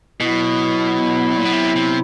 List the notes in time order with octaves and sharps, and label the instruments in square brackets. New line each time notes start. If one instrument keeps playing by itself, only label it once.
[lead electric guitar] B2 [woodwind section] F#3 B3 E4
[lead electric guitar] A#2
B2
C3
C3